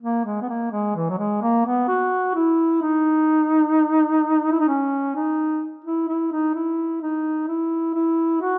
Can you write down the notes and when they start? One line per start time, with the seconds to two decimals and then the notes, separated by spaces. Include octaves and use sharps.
0.02 A#3
0.25 G#3
0.42 B3
0.49 A#3
0.72 G#3
0.96 E3
1.10 F#3
1.19 G#3
1.42 A#3
1.66 B3
1.88 F#4
2.35 E4
2.82 D#4
4.53 E4
4.60 D#4
4.68 C#4
5.15 D#4
5.85 E4
6.09 E4
6.32 D#4
6.55 E4
7.02 D#4
7.48 E4
7.95 E4
8.41 F#4